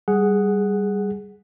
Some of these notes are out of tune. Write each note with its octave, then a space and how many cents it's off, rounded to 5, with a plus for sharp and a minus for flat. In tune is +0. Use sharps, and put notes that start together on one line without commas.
G3 +0 G#4 +0 F#5 +0